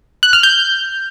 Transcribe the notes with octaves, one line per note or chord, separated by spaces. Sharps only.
F#6
F6
G6